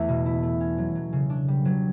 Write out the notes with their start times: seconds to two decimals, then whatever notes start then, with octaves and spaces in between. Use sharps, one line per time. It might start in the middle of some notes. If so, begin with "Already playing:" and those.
Already playing: E2 A3
0.08 B2
0.26 E4
0.43 A3
0.60 C#4
0.78 F#3
0.95 F#3
1.13 C#3
1.30 D4
1.48 G3
1.65 F#3